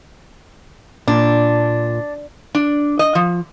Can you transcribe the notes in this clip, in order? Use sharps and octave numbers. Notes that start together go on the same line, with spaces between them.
A#2 D4
D4
D#5
F3